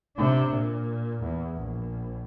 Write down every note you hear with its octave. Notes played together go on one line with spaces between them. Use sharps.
C3 D4
A#2
E2
A#1